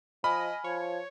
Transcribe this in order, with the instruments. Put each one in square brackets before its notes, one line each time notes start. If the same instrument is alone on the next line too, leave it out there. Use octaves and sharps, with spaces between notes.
[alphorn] F3 [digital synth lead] D#5 [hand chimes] G#5 F6 [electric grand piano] B5
[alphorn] F3 [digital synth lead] C#5